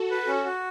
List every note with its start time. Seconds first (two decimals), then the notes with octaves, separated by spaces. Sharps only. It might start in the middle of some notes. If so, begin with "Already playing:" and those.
Already playing: F#4 A4
0.11 B4
0.27 C#4
0.45 F#4